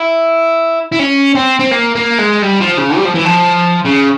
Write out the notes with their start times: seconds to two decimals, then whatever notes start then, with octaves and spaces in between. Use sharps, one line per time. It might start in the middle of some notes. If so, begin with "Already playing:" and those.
Already playing: E4
0.92 E4
0.99 C#4
1.35 C4
1.59 C4
1.71 A#3
1.95 A#3
2.18 G#3
2.42 G3
2.61 F3
2.78 C#3
2.97 G3
3.05 F3
3.15 E3
3.25 F3
3.86 C#3